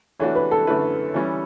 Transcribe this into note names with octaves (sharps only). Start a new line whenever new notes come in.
E3 A3 D4 F#4 C#5
B4
A4
F#2 D3 A3 E4 B4
E3 G3 C#4